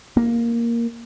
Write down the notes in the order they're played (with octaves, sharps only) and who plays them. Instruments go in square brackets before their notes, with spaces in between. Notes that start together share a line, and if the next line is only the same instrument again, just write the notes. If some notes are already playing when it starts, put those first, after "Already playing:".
[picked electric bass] A#3